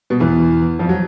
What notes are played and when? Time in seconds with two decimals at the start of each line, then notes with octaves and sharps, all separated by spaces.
0.10 B2
0.20 E2 E3
0.79 F2 F3
0.89 F#3